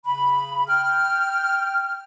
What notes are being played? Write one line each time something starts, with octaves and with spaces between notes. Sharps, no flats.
C#3 B5
G5 F6